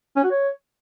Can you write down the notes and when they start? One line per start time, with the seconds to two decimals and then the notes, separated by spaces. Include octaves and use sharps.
0.16 C#4
0.24 F#4
0.31 C#5